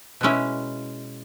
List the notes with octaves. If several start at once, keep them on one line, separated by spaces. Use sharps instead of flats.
B2 G#3 C#4 E4